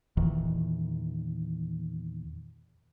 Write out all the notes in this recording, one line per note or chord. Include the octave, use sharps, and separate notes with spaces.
E2 A#2 D#3 E3